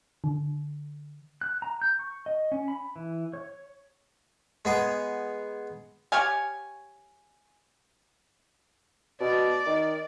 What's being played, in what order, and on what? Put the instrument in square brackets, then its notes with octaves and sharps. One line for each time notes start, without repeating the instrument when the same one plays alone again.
[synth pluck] D3
[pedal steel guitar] F#6
A#5
G6
C#6
D#5
C#4
B5
E3
C#5
[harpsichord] G#3 B3 G#4
[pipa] G4 C#5 F5 G#5
[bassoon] B2 [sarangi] D5
[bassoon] D#3